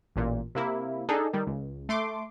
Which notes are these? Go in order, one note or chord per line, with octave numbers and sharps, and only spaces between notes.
A1 A#2
C3 A#3 E4
D4 D#4 G#4 A4
D#3 G3
C#2
A3 C6 D6